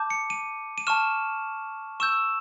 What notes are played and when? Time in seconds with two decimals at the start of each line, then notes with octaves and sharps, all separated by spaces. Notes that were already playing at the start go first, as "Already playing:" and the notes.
Already playing: A5 D6 G6
0.10 C#7
0.30 D#7
0.78 D#7
0.87 A5 C#6 F6 E7
2.00 C#6 E6 G6 E7